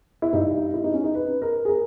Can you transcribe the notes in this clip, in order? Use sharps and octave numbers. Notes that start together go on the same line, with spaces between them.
E4
G2 G3 D#4
E4
D#4
C#4
D#4
B4
A#4
G#4
A#4